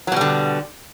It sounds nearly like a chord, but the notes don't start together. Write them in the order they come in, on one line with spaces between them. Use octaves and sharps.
F#3 B2 G3 D3